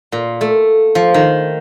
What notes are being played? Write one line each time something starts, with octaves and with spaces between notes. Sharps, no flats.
A#2
A3
F3
D#3